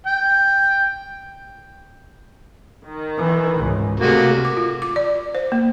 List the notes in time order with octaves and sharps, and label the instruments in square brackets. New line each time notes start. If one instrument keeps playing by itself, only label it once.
[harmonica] G5
[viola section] D#3
[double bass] E3
C#2 G#2
[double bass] C3 [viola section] A3 G#4 [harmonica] A#3 F#4
[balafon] D6
F4
D6
D5
C5
A#3